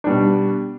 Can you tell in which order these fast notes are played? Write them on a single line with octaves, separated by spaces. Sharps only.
D4 G3 B2